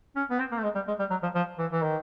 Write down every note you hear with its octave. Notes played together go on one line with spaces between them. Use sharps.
C#4
B3
C4
A#3
A3
G#3
G3
G#3
G3
F#3
F3
F3
E3
E3
D#3